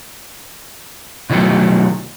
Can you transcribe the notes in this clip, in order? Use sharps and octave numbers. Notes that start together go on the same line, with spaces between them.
B2 D#3 E3 F#3 A3